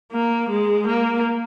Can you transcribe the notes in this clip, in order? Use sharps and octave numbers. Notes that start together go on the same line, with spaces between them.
A#3
G#3
A#3